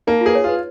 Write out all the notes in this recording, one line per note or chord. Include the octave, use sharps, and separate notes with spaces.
A#3 D#4
F4
G#4 B4
C#5
F4 B4